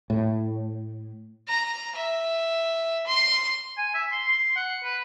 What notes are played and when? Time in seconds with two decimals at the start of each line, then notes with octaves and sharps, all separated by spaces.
0.10 A2
1.48 A#5
1.96 E5
3.07 C6
3.78 G#5
3.94 E5
4.12 C6
4.29 C6
4.56 F#5
4.84 B4